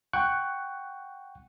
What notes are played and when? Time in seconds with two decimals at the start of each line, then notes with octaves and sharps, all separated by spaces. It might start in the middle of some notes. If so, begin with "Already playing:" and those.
0.13 F#5 G5 C#6 F#6